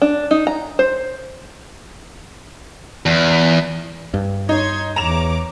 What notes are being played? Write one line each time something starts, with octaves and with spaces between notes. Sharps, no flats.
D4
D#4
A#5
C5
E2
G2
D#4 C#5 C6 G#6
E2 C#5 A#5 D6 E7 F7